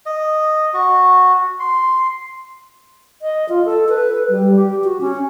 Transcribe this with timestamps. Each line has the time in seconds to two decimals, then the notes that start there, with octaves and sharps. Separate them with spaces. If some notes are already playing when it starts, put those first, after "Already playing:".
0.06 D#5
0.74 F#4
1.60 C6
3.22 D#5
3.49 F4
3.65 A4
3.89 B4
4.30 G3
4.56 G4
4.84 F#4
5.01 C#4